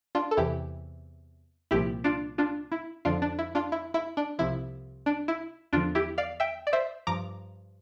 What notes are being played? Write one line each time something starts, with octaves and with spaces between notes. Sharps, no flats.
D4 F4
A4
E2 C3 E3 E4 G4
C2 A#2 F3 E4 G4
D4 F4
D4 F4
E4
F2 D3 F3 D4 F4
D4
E4
D4 F4
E4
E4
D4
C2 C3 F3 E4
D4
E4
E2 D3 F3 D4 F4
E4 G4
D5 F5
E5 G5
D5
C5 E5
G2 F3 A#5 D6